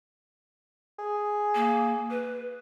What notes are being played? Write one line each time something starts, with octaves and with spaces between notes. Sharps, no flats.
G#4
A#3
B4